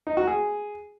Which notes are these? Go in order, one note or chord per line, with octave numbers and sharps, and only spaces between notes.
D#4
F#4
G#4